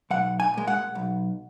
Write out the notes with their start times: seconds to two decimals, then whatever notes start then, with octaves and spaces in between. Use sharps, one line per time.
0.10 B1 F#5
0.40 G#5
0.54 A#2 G#3
0.68 F#5
0.95 B1